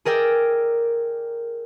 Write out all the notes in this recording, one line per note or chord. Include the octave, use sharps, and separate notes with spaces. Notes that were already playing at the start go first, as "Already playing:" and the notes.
G#4 A#4 D5 G5 E6